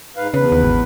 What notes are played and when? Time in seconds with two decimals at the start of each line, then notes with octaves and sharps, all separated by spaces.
0.17 G#2 B4 F5
0.34 E2 C#3 B4
0.52 D#2
0.64 G#1